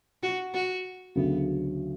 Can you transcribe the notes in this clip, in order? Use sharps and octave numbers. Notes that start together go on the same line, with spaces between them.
F#4
F#4
D2 C#3 F#3 B3